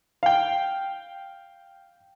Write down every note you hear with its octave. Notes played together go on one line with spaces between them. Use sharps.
F5 G5